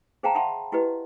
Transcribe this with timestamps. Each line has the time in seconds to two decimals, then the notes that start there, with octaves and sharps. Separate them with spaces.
0.23 G#4 C5 F5 G5 A5 A#5
0.35 E5 F#5 A5 B5 C6
0.72 E4 F#4 G4 B4 D#5